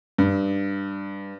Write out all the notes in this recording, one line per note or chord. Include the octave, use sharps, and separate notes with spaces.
G2